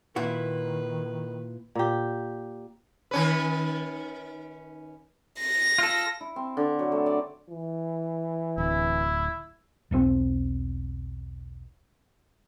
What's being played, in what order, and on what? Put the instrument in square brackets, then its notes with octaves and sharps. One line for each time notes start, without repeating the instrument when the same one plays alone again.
[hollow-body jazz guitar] A#2 E4 F#4 [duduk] D#3 [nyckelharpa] B4
[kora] A#2 G4
[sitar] D#3 C#4 B4
[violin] A#6
[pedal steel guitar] F4 A4
[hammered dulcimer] E4
C4
D3
F#3
A3
D5
[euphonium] E3
[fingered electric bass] D1 [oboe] E4
[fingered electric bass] E1 B1 A2 C4